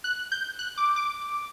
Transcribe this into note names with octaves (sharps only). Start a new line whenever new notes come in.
F#6
G6
F#6
D6
D6